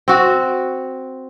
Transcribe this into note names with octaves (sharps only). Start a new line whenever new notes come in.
C4 F#4